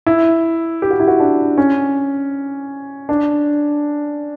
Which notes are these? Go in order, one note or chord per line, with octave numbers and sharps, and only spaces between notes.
E4
G4
F#4
E4
F#4
D4
C#4
D4